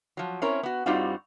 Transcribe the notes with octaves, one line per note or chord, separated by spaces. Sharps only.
F3 F#3
C4 C#4 E4 A#4 C#5
B3 F#4
G2 G3 C4 D#4 F4 F#4